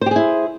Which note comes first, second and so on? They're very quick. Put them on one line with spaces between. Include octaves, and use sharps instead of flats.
C5 G4 G#4 E4